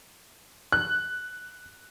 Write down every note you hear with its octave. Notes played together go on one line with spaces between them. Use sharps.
F#6